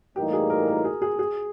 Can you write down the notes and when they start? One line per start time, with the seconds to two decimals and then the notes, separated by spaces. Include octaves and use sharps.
0.16 A2 E3 G3 A#3 D#4 G4
0.33 G#4
0.50 A#4
0.67 A#4
0.85 G#4
1.02 G#4
1.19 G#4